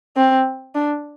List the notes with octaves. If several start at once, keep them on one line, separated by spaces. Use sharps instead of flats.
C4
D4